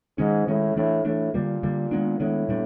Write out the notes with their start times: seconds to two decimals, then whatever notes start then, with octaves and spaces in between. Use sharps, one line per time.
0.18 G#2 D#3 G#3 C#4
0.48 A2 D#3 G#3 C#4
0.76 A2 E3 A3 D4
1.05 A2 E3 A3 D4
1.34 A#2 D3 G3 A#3
1.63 D3 G3 A#3
1.91 D#3 G#3 B3 D4
2.20 A2 D#3 G#3 B3 D4
2.49 A#2 G3 B3 D4